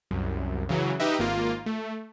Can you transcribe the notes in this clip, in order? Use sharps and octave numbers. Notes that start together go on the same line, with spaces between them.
C2 F#2
C#3 E3 F#3
D#4 G4 B4 D#5 E5
G#1 A#3 F4
A3